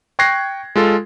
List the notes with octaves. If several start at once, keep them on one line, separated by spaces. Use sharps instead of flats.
G5 C#6 F#6 G#6 A#6 C7
G#3 F4 A4